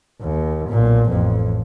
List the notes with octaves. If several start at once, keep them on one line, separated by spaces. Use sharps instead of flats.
D#2
B1 A#2
A1 F2